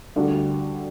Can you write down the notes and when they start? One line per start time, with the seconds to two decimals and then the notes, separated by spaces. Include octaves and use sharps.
0.15 D2 D3 G3 D4 F#4